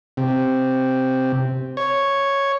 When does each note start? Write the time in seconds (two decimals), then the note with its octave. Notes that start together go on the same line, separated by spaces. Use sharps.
0.17 C3
1.77 C#5